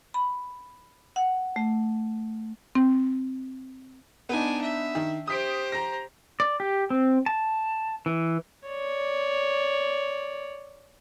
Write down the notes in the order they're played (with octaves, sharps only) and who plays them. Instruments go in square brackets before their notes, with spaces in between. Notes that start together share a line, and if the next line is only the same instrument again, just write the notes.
[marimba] B5
F#5
A3
C4
[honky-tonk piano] B3 D#4 [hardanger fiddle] D4 G#5
[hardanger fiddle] E5
[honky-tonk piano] D#3
[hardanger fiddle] G4 C5 [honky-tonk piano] D#6 B6 D7
[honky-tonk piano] A#5 A#6
[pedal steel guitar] D5
G4
C4
A5
E3
[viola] C#5 D5